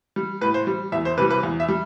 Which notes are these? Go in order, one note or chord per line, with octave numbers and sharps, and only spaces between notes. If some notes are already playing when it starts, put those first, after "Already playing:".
G3
A2 B4
C5
G3
E2 E5
C5
C3 E3 G3 B4
B4
E2
E5
G3